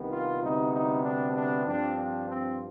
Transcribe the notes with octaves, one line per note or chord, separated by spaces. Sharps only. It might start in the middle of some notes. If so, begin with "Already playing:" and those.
Already playing: C2 C3 D#3 B3
F4
D2 C3 G3 B3 D#4
D#4
D4
D4
G2 F3 C4 D4
D4
C4